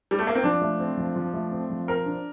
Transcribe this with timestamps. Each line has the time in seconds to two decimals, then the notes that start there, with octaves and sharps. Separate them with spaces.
0.11 G3
0.19 A3
0.27 A#3
0.35 C4
0.44 F3 D4
0.62 A3
0.80 C4
0.98 F3
1.16 F3
1.34 A3
1.51 C4
1.70 F3
1.88 A#4 C5
2.06 D4